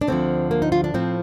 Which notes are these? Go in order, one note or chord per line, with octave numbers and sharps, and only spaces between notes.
D4
D2 D3 F3 C4
A#3
D#4
F4
D4
A2 F3 C4